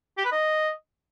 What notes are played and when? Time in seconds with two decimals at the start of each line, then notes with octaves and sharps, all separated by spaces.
0.18 G4
0.25 B4
0.32 D#5